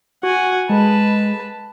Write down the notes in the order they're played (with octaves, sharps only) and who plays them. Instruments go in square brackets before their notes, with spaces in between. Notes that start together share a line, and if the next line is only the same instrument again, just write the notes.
[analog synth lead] F#4 [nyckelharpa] F#5 G#5
[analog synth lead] G#3 [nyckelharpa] B4 A5